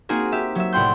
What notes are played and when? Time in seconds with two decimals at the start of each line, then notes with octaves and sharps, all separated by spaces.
0.09 A#3 C4 D#4 F#4 G#4 A#4
0.32 G4 E5
0.55 F#3 E5
0.73 C2 A2 F#5 G5 C6 G6